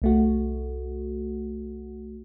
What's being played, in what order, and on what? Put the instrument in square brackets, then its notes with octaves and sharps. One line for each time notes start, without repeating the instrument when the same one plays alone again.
[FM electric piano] C2 A3 F#4